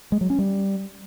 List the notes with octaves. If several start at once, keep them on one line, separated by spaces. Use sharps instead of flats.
G#3
F#3
C#4
G3